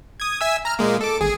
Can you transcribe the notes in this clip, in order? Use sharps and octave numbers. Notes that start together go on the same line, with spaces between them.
D#6 G#6
E5 G#5 E6
A#5 F6
A#2 G#3 A#3
A4 D6
G#1 G#4